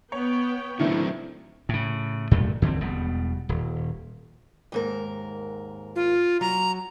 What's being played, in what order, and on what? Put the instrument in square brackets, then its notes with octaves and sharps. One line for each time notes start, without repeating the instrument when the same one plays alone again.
[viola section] B3 G5 [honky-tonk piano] C#5
[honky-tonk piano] D#3 D4 [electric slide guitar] F#3 A3 C4 [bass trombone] E4
[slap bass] A2 C#3
F#2 A#2 A3
F2 D3 E3 C4
E1 B2 G3
D#1
[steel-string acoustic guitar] D#2 G#2 A#4
[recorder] F4
[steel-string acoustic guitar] F#3 [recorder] A#5